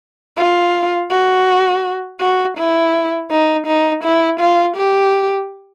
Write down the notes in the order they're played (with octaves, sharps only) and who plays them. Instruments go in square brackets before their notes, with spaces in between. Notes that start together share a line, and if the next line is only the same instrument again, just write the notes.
[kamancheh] F4
F#4
F#4
E4
D#4
D#4
E4
F4
G4